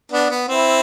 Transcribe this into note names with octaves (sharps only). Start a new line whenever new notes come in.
B3 D4
B3
C4 E4